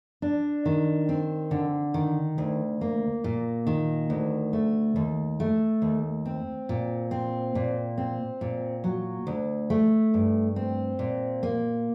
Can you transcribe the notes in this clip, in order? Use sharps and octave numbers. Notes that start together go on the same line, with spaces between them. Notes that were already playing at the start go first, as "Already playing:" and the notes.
D4
D#3
C4
D3
D#3
D2
A#3
A#2
D#3
D2
A3
D#2
A3
D#2
C4
A#2
C4
A#2
C4
A#2
F#3
D2
A3
G2
C4
A#2
A#3